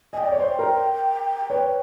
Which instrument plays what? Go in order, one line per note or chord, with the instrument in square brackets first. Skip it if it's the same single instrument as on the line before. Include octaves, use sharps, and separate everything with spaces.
[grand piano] D#5 [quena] G#5
[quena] G5
[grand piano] D5
C#5
C5 D5
A#4 C5
B4 C#5